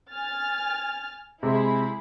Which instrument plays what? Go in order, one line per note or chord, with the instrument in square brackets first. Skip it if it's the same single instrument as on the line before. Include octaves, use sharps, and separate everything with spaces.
[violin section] G#5 F6 A6
[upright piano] C3 G#3 [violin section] E4 G#4 B5